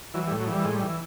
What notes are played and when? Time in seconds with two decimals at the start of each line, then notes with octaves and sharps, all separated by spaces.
0.14 E3 F#3
0.27 G3
0.31 A2
0.40 F#3
0.47 E3 G3
0.63 A2 G#3
0.75 G3
0.81 E3